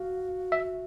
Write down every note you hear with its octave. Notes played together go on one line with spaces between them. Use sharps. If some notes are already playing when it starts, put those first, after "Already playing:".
Already playing: F#4 F5
E5